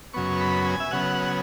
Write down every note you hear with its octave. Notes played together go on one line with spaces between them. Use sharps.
F#2 C#3 F#3 B3 C#6
B5
G#5
E5
C#3 F#3 B3 F#5